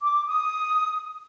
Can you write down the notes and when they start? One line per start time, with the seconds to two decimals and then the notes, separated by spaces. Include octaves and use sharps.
0.02 D6
0.27 D#6